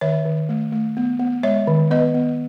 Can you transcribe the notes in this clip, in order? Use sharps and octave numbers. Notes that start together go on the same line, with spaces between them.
D#3 C#5 E5
D#3
A3
A3
B3
B3
G#3 C#5 E5
D#3
B3 B4 D#5
B3